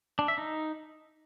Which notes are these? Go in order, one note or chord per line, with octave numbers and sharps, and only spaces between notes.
D4
E5
D#4